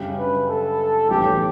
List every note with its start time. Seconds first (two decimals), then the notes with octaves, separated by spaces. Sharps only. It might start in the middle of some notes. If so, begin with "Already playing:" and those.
Already playing: F#2 C#3 G3 D4 G4
0.17 B4
0.48 A4
1.08 B1 A2 E3 G3 C#4 G4